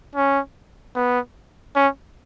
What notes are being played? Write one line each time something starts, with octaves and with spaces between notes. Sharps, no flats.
C#4
B3
C#4